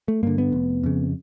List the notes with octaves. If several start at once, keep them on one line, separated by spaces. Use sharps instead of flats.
A3
G2 D3 A#3
B3
F1
F2 C#3